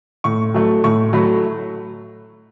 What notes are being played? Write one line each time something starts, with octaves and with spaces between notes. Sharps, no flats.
A2 C#6
F#3 A3
A2 C#6
F#3 A3 B5